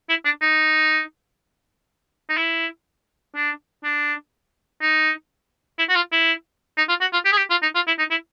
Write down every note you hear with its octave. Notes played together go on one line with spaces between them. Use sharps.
E4
D4
D#4
D#4
E4
D4
D4
D#4
E4
F#4
F4
E4
D#4
F4
F#4
F4
G4
G#4
G4
F4
D#4
F4
E4
D#4
E4